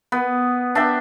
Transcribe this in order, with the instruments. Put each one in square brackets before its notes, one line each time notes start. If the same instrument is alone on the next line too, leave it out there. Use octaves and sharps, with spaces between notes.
[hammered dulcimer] B3
D4 E5 G5